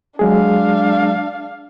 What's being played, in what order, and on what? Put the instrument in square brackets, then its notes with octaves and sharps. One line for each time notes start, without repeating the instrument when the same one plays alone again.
[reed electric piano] F#3 G#3 G#4 [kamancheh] D4 F5